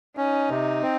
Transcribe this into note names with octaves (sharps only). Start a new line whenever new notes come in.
C#4 D#4
C3
C4